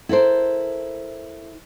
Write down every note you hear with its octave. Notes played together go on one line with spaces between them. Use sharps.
E4 A4 A#4 C5